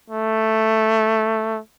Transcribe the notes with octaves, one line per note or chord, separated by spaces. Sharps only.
A3